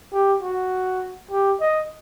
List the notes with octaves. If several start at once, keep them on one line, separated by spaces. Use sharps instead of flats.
G4
F#4
G4
D#5